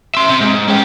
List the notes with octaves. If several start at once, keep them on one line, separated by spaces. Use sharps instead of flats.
E5 C6
C3
G#2
C#4 G4